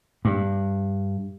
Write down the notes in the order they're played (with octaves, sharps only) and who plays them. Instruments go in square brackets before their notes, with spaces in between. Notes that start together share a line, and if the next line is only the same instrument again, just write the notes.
[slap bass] G2